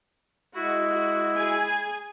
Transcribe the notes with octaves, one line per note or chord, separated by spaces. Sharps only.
G#3 E4 F#4
F#4
G#4 G#5